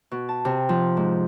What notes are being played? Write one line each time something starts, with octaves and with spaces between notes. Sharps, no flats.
B2
A5
C3
F3
G#2